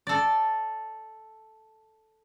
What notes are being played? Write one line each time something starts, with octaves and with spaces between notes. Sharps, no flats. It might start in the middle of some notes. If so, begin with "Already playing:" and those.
A4 D5